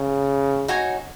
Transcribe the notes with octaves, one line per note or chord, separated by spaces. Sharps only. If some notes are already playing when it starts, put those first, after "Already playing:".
Already playing: C#3
D#4 F#4 C#5 G#5